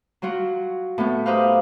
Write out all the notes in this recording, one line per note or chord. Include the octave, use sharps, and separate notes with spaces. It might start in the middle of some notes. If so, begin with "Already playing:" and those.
F#3 F4 F#4
A2 B3
D#4 G4 B4 C5 F5